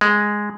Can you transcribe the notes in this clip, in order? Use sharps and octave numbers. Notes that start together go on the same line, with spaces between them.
G#3